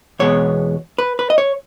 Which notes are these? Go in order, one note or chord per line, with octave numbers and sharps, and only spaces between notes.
E2 B2 G#3 B3 C#5
B4
B4
D#5
C#5